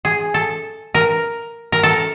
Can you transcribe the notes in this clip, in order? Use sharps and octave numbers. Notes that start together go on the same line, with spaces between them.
G#4
A4
A#4
A#4
A4